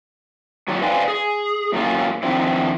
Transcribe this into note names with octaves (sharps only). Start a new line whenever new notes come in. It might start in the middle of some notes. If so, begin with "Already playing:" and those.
F#3 D#4 F4 G4 C#5 D5
B4 C5 D5 F5 G5 G#5
G#4
A2 F#3 A#3 C#4 F4
D#3 F3 C4 D4 E4